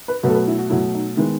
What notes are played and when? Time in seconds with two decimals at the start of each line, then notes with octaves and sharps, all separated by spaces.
0.08 B4
0.23 B2 F#3 A3 B4
0.29 A4
0.35 B4
0.48 E4
0.58 F#4
0.70 B2 F#3 A3 E4
0.94 D#4
1.17 D#3 G#3 B3 E4